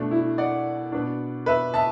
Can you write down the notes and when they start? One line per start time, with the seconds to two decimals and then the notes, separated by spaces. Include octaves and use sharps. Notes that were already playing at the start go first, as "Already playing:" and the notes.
Already playing: B2 A3 D4
0.11 E4
0.38 D5 F#5
0.92 B2 B3 D4
1.46 B4 E5
1.74 E5 A5